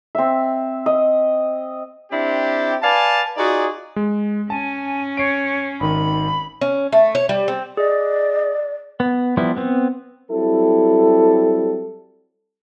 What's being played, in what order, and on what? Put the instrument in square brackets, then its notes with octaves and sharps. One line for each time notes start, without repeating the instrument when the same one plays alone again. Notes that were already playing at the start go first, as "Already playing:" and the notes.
[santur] C4 E5
D#5
[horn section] C4 D4 E4 G4
B4 D5 F5 G#5 A5
D#4 F4 F#4 G#4 D5
[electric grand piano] G#3
[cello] C#4 [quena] G#5 [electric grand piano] A5
[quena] C#5 [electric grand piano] C7 D7
[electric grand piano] G#1 D#3 [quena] B5
[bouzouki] C#4
A3
C#5
G3
C4
[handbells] G#4 D#5 [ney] D5
[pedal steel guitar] B3
F3 G3 B3 E4
B3 C4
[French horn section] F#3 G3 C4 E4 A4